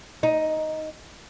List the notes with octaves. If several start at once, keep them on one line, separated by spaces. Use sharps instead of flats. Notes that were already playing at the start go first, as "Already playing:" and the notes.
D#4